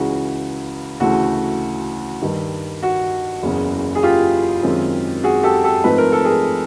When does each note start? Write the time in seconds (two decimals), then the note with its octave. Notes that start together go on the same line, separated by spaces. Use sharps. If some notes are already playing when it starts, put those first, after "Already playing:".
Already playing: C#2 C#3 E3 F#4
1.00 D2 C#3 E3 A3 F#4
2.22 G2 D#3 G3
2.83 F#4
3.42 F#1 E2 C#3
3.95 G#4
4.03 F4 G4
4.63 F#2 D#3 G#3 C4
5.24 F#4 G#4
5.43 G4 A4
5.64 G4 A4
5.83 G#2 F3 A3 C4 D#4 B4
5.98 A#4
6.12 A4
6.25 G#4 A#4